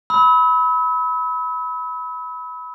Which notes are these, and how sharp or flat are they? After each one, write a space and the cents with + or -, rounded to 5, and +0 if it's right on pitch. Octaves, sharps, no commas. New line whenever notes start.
B5 +0 E6 -40